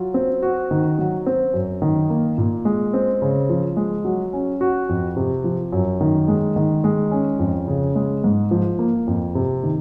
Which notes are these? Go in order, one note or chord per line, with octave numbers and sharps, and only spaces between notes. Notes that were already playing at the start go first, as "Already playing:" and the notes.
Already playing: F#3 F4
C4
F#4
D#3
F#3
C4
F#2
D#3
A#3
A#2
G#3
C4
C#3
F3
G#3
F#3
C#4
F#4
F2
C3
F3
F#2
D#3
G#3
D#3
G#3
C#4
F2
C#3
G#3
G#2
F3
A#3
F2
C3
D#3